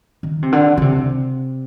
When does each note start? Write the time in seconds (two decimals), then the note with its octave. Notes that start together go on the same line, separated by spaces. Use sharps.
0.23 D#3
0.42 C3
0.52 D3
0.77 D3
0.82 C3